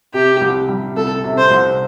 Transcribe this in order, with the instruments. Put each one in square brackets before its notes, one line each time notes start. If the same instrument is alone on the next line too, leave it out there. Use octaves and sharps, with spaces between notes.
[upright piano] C3 [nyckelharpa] G4
[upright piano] C2
G3
[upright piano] C2 [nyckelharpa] A4
[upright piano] C3
[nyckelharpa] C5
[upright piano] C2